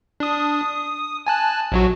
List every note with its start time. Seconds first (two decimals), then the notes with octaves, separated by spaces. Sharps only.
0.20 D4 D#6
0.61 D#6
1.27 G#5 A5 F#6
1.72 A#1 F#3 F#4